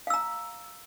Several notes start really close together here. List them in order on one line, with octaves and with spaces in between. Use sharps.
F5 E6 A#5